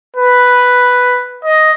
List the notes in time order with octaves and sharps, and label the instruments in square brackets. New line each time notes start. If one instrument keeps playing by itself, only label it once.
[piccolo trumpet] B4
D#5